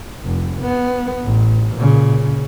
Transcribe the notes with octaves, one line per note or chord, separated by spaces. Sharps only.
F1
B3
A1
A#2 C#3